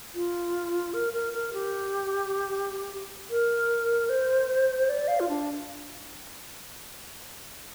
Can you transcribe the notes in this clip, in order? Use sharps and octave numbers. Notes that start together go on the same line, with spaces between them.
F4
A#4
A#4
A#4
G4
A#4
C5
D5
F5
F4
D4